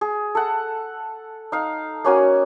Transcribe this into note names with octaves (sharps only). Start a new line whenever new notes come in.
G#4
A4 F#5
D#4 F5
A#3 C#4 F#4 G#5